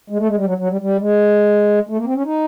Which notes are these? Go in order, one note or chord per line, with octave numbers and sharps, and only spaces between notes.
G#3
A3
G#3
G3
F#3
F#3
G3
G3
G#3
A3
A#3
C4
C#4
D#4